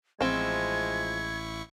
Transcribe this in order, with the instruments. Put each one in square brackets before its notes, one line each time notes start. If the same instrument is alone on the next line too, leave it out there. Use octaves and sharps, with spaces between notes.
[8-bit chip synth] A1 E4 C#6 [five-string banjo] F3 C4 [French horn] G#3 [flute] G#6